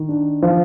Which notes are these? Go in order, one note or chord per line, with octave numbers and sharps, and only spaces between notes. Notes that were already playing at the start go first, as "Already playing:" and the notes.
Already playing: D#3
D4
F3